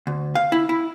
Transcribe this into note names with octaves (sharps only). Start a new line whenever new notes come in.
D2
F5
E4
E4